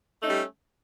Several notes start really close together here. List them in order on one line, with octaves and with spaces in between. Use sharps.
A3 D#4 C#4 G3